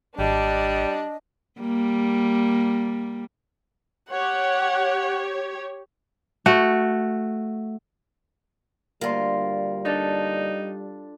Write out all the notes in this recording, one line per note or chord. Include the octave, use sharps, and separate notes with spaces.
G#1 G3 D4 D#5
G3 A#3
G4 C#5 F#5
A3 F#4
D2 G3 A#3 F4 C6
D4 D#4 A4